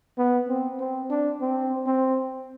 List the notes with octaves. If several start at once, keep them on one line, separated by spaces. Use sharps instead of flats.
B3
C4
C4
D4
C4
C4